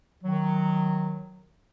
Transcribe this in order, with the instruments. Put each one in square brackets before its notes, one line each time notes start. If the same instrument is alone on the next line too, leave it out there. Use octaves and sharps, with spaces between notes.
[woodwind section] D#3 F#3